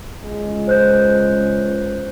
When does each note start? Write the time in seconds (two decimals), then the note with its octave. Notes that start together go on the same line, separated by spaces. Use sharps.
0.22 C#2 G#3
0.67 C5 F#6 G6